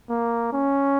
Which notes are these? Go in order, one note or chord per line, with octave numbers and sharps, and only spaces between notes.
A#3
C#4